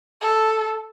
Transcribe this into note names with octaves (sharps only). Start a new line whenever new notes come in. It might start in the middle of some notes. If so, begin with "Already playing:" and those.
A4